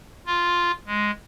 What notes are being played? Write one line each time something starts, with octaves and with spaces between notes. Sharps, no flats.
F4
G#3